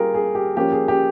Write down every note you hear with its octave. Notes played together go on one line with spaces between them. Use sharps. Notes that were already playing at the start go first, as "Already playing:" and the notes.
Already playing: G3 A#3 F4 G4 G#4 A#4
G#4
G4
F3 A#3 C#4 G4
G#4
G4